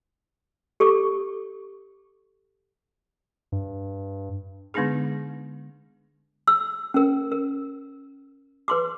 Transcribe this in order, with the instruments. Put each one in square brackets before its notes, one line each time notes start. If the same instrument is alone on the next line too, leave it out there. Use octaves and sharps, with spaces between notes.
[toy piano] G4 A4 C#6 D6
[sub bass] G2
[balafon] D3 G#3 B3 D4 D#4 G#4
[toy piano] E6
C#4 A#4
A#4
B4 C6 D6